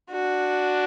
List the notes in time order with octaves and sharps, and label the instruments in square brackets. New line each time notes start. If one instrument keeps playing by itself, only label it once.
[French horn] D4 [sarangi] F#4